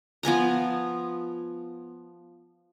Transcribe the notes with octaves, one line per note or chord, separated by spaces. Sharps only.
F3 B3 G#5 A#5